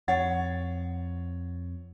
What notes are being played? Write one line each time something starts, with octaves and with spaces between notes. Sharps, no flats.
F2 C#5 F#5 A6